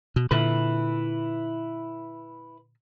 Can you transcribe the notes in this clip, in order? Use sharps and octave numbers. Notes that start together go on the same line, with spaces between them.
B2
A#2 D3 E4 B4